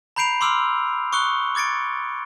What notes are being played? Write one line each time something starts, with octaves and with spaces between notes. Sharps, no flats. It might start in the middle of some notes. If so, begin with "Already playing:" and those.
A#5 B5 G6 C7 D7 F7
C6 D6 E6 F6 D7
C#6 D#6 F#6 C#7 G7
D6 G#6 A6 C#7 D7